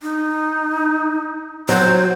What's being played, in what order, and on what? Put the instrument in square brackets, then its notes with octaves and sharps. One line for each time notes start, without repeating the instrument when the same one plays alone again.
[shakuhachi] D#4
[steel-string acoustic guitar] F#3 [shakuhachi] C5